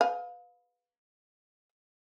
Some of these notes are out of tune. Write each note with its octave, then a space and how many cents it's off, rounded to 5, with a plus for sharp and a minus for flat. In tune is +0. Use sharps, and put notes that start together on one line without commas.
G#4 +35 B4 +0 F5 +30